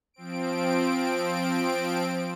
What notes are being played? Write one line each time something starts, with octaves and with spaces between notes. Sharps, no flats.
F3 C4 D7